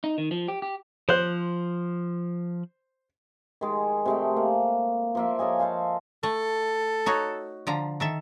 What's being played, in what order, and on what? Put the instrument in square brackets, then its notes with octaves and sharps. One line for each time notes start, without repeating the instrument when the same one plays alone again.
[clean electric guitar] D#4
D#3
F3
G4
G4
[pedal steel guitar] F3 F#6 [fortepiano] C5
[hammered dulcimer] D#3 G#3 G#4
C3 G#3 A3
A#3
F3 A#3 E5
A4 C#5 D#5 G#5
A4 C5 F5 G#5
[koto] A3 [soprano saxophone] A4
[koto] D#4 F#4 C#5
D3 F3 A#5
D#3 A4 E5